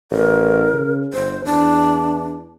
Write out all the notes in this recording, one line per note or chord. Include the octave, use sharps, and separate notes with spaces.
A1 A#4
C#3
G1 C5
E2 D4